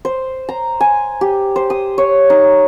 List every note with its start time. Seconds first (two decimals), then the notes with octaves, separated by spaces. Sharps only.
0.05 C5
0.49 A#5
0.80 G#5
1.21 G4
1.56 C5
1.70 D#6
1.98 C#5
2.30 D#4